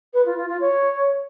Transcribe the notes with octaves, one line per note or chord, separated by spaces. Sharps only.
B4
F4
F4
F4
C#5